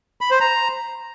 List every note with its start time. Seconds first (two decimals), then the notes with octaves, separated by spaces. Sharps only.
0.21 B5
0.31 C5
0.41 A#5